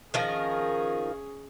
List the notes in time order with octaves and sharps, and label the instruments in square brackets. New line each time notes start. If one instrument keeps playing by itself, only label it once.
[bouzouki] D#3 F3 A#4 [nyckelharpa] C#4 G#4